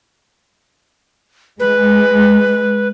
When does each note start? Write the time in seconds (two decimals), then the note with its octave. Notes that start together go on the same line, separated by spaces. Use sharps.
1.60 G#3 B4